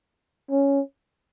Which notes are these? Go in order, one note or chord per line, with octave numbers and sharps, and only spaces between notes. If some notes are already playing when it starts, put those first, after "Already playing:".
C#4